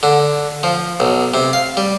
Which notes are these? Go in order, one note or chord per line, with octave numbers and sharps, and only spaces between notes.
D3
F3
B1
C3
F5
G3